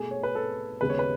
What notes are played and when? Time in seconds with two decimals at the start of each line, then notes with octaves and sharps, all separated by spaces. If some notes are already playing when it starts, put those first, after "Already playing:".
Already playing: B2 A3 G#4
0.11 C#5
0.23 B4
0.35 A4
0.81 D#2 C#3 G#3 B3 B4
0.90 C#5
0.99 B4